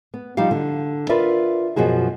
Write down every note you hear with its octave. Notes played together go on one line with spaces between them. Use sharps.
B3
F3 G3 D#4 G4 F5
D3
F4 A#4 B4 D5 E5
F#2 B2 F3 F#4 G#4